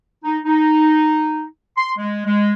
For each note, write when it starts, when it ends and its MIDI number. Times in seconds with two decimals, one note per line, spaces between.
0.24 0.38 63
0.45 1.44 63
1.77 1.92 84
1.98 2.23 56
2.25 2.52 56